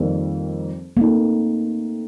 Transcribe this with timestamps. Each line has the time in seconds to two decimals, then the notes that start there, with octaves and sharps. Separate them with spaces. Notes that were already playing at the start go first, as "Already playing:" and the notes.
Already playing: F2 D#3 G3 A#3
0.97 A3 A#3 C4 D#4